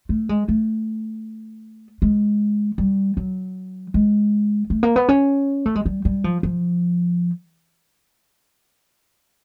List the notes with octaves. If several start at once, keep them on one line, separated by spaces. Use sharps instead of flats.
A3
G#3
A3
G#3
G3
F#3
G#3
A3
A#3
B3
C#4
A3
G#3
G3
G3
F3
F3